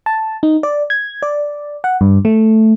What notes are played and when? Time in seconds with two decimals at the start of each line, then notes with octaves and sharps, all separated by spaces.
0.06 A5
0.43 D#4
0.63 D5
0.90 G#6
1.22 D5
1.84 F#5
2.01 G2
2.25 A3